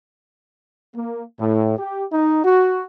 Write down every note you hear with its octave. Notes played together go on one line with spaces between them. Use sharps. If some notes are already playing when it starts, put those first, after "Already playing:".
A#3
A2
G4
D#4
F#4